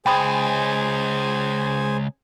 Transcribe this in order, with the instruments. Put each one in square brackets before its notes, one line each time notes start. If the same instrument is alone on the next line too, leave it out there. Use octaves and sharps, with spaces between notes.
[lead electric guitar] C#2 [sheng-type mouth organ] G#4 C5 G#5 [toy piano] G5 B5 D#6